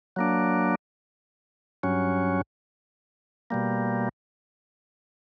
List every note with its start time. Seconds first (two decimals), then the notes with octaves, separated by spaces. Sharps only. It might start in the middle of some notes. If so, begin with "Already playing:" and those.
0.16 F#3 A#3 D4
1.83 G2 F#3 C#4
3.50 B2 G3 A#3